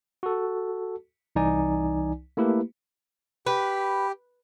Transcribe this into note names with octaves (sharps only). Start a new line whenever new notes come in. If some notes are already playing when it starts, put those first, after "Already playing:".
F#4 A4
C2 E3 D#4 D5 G#5
A3 A#3 E4 G4 B4
G4 B4